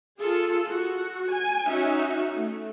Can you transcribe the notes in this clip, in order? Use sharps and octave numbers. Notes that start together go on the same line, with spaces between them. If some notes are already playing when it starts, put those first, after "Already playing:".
F4 G#4 A4
F#4
G#5
C#4 D#4 F#4 E5
A3